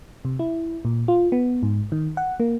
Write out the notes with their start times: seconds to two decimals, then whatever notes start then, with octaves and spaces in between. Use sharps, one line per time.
0.25 C3
0.39 E4
0.85 A#2
1.08 F4
1.32 B3
1.63 G#2
1.92 D#3
2.17 F#5
2.40 A#3